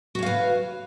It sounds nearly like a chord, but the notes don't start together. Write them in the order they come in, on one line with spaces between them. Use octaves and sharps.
F#4 C#5 F5 B4